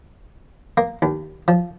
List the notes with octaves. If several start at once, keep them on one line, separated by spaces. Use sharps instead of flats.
A#3
D#2
F3